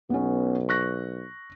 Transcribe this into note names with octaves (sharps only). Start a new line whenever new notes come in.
B1 B3 C#4
C#6 F#6 A#6